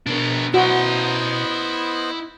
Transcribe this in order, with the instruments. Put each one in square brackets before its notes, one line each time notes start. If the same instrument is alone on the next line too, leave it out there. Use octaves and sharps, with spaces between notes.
[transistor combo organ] B2 [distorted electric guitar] D4 A#4
[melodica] B3 C5 D#5 [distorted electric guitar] E4 A#5 [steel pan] F#4